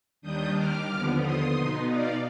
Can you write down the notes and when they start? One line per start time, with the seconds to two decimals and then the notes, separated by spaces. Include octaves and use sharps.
0.22 D#2 D#3 G3 D4 D#6 G6
0.55 D6 F6
0.88 D#2 D3 F3 B3
1.21 C6 D#6
1.54 B2 B3 D#4
1.88 D5 F5